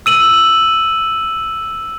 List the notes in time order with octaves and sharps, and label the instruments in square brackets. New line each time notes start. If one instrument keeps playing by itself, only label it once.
[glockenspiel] E6 D#7 F#7